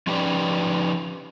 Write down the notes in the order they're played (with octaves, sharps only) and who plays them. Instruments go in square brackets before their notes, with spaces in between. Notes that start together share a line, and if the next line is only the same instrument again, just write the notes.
[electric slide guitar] F3 C#4 D#4 G4 B4 D5